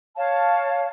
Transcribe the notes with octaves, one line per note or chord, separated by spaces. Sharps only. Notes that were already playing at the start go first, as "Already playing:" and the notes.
C#5 F5 A5